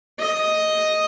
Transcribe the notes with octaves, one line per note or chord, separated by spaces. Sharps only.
D#5